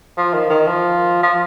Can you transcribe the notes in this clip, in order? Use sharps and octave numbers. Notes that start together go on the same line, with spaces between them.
F3
D#3
D#3
F3
F3